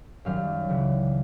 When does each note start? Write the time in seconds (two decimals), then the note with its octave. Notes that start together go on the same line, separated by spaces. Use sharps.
0.25 F#2 D#3 G3 F5
0.68 C#2 C#3 E3 G3